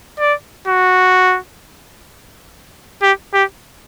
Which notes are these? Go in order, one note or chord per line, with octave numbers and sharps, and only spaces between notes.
D5
F#4
G4
G4